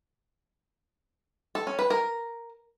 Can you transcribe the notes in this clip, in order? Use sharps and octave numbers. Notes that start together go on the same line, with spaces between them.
A4
C#4
B4
A#4